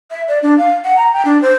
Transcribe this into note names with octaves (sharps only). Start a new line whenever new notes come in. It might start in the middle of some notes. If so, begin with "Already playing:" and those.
E5
D5
D4
F5
F#5
A#5
G5
D4
C5